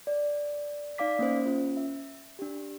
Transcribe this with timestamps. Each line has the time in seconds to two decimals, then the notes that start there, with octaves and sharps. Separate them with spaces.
0.07 D5
0.98 D#4 D5 F5 D6 B6
1.19 A#3 C#4 C5
1.46 C#4 F4
1.77 E5
2.39 D4 G4